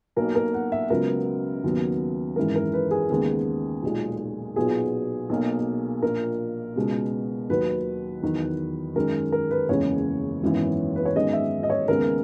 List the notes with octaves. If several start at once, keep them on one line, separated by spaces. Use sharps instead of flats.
B1 B2 A#3 A#4
A#4
F#5
E5
C#2 C#3 F#3 B3 A#4
D#2 C#3 F#3 B3
G#1 F#2 E3 G#3 A#4
A#4
B4
G#4
D#2 C#3 G#3 B3 G#4
B1 A#2 G#3
B1 A#2 F#3 B3 G#4
B1 B2 A#3
A#1 A#2 A#3 A#4
C#2 B2 G#3 B3
D#2 D#3 F#3 B4
E2 D#3 F#3
F#2 D#3 G#3 A#4
A#4
B4
F#1 E2 C#3 G#3 C#5
G#1 F#2 E3 B3
B4
C#5
G#1 F#2 D#3 G#3 B3 D#5
E5
D#5
C#5
D#2 C#3 G#3 B3 A#4